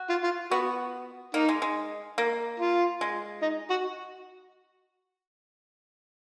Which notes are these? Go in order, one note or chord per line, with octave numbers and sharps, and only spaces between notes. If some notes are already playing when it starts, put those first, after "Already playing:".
Already playing: F#4
F4
F4
B3 F#4
A#3 D#4
G#3
G#3
A#3
F4
G#3
D#4
F#4